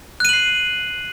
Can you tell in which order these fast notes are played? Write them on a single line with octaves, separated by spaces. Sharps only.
F#6 D#7 F#7 C7